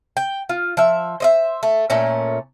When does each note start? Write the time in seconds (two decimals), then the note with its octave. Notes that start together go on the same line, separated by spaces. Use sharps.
0.17 G5
0.49 F4
0.77 F3 E5
1.20 C5 D#5 E5
1.63 A3
1.90 A#2 A3 C#4